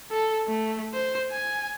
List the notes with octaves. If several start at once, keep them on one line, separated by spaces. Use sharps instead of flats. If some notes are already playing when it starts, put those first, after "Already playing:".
A4
A3
C5
G#5